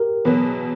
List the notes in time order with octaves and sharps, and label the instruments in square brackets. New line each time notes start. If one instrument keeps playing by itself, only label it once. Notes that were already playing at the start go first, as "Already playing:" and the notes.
Already playing: [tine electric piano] G4 A#4
[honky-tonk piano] E2 B2 F#3 B3 [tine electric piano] B4